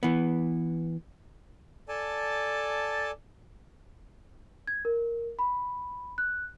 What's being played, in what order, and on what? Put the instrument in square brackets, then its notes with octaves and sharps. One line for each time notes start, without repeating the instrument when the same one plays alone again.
[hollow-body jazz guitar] E3 B3
[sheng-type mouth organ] A4 D5 G#5 A5
[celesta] G#6
A#4
B5
F#6